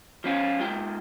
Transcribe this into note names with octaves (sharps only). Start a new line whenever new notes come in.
F3 C#4 F4
G#2 F4 G5